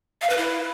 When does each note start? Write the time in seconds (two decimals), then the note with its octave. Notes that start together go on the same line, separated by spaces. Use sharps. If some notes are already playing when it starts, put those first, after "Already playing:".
0.22 F5
0.30 B4
0.38 E4